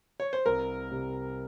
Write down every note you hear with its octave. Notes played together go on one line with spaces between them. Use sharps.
C#5
C5
C2 A#4
C3 G3